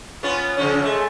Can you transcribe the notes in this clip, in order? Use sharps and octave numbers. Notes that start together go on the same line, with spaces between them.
B3 C#4 F4
C#3 F3 C#4
G#3 A3